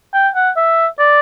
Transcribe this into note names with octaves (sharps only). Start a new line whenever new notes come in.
G5
F#5
E5
D5